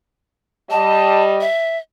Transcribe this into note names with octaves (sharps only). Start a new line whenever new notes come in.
G3 D#5 A5
E5